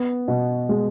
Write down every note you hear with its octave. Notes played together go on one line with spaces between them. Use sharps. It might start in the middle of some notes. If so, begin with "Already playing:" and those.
Already playing: B3
B2
G#3